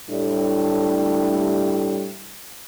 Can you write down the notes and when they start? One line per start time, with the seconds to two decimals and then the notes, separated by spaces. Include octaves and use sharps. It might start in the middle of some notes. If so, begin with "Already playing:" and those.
0.10 A2 G3 D4